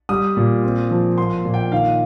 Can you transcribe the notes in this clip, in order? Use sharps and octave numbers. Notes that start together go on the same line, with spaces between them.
G3 D#6
A#2
C4
F3
A#3 C6
A#2
G5
D#3 F5